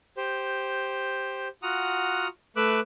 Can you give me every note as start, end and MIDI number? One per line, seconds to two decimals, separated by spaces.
0.17 1.48 67
0.17 1.48 72
1.63 2.28 65
1.63 2.28 66
1.63 2.28 78
1.63 2.28 82
1.63 2.28 87
2.56 2.80 57
2.56 2.80 71
2.56 2.80 76
2.56 2.80 86
2.56 2.80 90